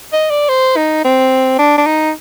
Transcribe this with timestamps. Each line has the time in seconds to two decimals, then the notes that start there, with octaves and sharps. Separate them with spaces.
0.13 D#5
0.30 D5
0.49 C5
0.77 D#4
1.04 C4
1.59 D4
1.78 D4
1.86 D#4